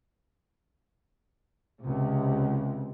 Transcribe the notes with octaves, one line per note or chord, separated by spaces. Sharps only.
C#2 C3